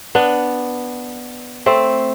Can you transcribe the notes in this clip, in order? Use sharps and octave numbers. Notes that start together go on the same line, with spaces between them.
B3 D4
A3 C4